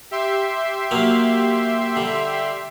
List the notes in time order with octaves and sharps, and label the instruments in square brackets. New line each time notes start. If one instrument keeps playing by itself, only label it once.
[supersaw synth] G4 E5 C6
[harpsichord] F#3 A#3 F5
D3 G3